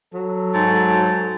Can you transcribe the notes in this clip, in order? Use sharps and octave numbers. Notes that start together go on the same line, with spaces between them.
F#3 A4
G#2 A5